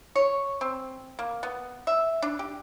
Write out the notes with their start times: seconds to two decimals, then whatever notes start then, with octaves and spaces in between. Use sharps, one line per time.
0.15 C#5
0.61 C4
1.19 A#3
1.43 B3
1.87 E5
2.22 D4
2.39 G4